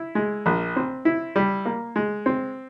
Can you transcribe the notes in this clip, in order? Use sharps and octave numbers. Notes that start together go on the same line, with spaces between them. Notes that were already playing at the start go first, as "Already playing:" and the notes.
Already playing: E4
G#3
A#1
C4
E4
G3
A#3
G#3
C4